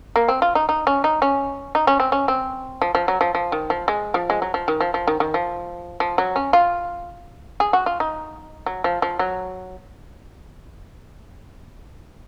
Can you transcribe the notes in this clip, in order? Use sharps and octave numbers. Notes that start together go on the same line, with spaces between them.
A#3
C4
F4
D#4
D#4
C#4
D#4
C#4
D#4
C#4
C4
C#4
C4
F3
F3
F#3
F3
F3
D#3
F3
G#3
F3
G#3
F#3
F3
D#3
F3
F3
D#3
D#3
F3
F3
F#3
C#4
F4
G#4
F#4
F4
D#4
F#3
F3
F3
F#3